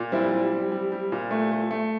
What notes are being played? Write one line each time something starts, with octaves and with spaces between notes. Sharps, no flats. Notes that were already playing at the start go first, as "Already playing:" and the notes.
Already playing: A#2
G3 C4 E4
G3
G3
G3
G3
A#2
A3
A3
A3